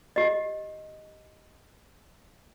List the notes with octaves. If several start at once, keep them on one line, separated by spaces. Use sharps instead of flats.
G4 D#5